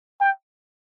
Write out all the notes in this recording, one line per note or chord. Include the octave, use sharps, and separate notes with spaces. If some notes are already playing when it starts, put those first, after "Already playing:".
G5